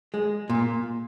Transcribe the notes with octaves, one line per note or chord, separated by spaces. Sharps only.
G#3
A#2